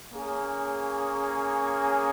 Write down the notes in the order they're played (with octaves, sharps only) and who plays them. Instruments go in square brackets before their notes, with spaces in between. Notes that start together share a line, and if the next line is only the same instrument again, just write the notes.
[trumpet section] A#3 C#4 G#4